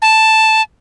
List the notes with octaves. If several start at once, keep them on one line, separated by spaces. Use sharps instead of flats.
A5